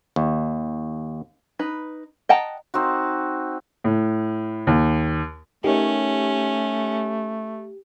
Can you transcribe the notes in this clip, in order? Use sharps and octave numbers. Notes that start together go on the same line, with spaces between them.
D#2
D#4 B4
D#5 F#5 G5 A5 A#5
C4 D#4 F#4
A2
D#2
A3 C#4 D#4 G4 A#4 C#5